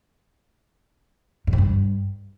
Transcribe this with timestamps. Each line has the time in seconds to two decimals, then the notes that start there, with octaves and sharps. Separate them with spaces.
1.47 G#2
1.53 A2
1.58 G2